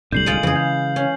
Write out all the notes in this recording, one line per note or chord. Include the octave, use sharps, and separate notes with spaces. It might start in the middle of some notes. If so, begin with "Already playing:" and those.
D1 C2 D3 G3 G6 C7 F#7
G#3 F4
F2 C#3 E3 G#4
F5 G6
C#4